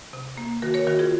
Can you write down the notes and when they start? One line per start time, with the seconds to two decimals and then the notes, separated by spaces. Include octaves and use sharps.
0.13 C3
0.37 A#3
0.62 D#3 F#4 A#4
0.74 A#4 C#5
0.87 D#3 F#4 A#4
0.99 F4 G#4